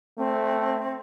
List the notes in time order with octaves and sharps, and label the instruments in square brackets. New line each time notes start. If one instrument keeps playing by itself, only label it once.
[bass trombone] A3 [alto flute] C4